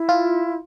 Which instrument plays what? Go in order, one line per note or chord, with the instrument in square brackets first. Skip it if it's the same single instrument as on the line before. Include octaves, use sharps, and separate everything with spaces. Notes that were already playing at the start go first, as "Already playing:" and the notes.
Already playing: [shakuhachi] E4
[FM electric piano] F4